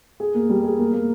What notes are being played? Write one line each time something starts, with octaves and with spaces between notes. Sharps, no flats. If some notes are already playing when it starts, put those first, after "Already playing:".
G#4
A#3
G3
G#4
A#3
A#3